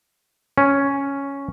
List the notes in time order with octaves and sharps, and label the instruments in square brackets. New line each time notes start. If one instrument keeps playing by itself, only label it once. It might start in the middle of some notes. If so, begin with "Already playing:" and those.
[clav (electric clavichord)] C#4